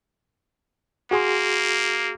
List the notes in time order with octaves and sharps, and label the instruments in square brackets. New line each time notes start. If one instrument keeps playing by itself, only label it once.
[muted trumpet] A#3 [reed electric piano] F#4 G#4 C6